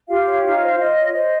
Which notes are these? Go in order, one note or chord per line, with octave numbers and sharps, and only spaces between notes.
F4 G4 F5
C#5
D#4 F4 F5
C5
F4 D#5
C#5
C5 D#5